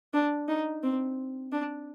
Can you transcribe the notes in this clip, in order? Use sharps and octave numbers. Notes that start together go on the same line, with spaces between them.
D4
D#4
C4
D4